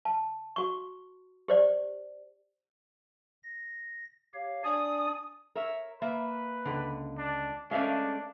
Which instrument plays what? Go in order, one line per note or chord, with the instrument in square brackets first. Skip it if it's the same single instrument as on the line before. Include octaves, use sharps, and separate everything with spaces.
[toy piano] A5
F#4 C#6
G4 C5 D5
[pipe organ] A#6
G4 C#5 F5
[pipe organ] D4 D5 G#5 [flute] D#6
[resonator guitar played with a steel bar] A#4 C#5 E5
[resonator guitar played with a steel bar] A#3 E5 [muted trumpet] B4
[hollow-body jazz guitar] C#2 D3
[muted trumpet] D4
[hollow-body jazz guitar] G#3 A3 C#4 [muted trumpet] D4 [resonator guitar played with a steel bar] A#4 E5 F5